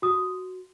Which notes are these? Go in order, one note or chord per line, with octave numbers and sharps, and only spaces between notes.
F#4 D#6